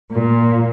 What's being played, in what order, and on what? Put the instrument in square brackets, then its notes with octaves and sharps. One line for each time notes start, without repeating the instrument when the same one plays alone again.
[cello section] A#2